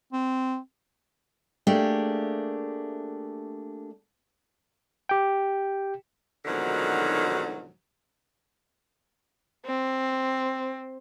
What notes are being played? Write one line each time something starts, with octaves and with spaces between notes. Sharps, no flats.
C4
A3 A#3 D4 G4 G#4
G4 G5
F2 G#2 B2 D3 D#3 F#3
C4